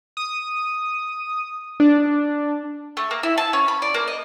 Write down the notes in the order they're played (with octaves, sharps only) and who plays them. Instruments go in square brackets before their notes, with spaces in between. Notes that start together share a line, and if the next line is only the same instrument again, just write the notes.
[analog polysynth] D#6
D4
[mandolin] A3
A#3
E4
A5
C#4
B5
D5
A#3
D#5